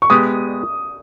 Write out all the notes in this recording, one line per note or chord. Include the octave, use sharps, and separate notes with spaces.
C#6
G#3 B3 G4 D#6